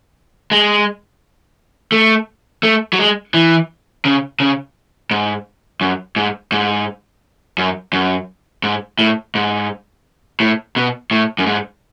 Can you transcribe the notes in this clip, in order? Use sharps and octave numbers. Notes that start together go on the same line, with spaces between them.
G#3
A3
A3
F#3
G#3
E3
C#3
C#3
G#2
F#2
G#2
G#2
F#2
F#2
G#2
A2
G#2
A2
B2
A2
F#2
G#2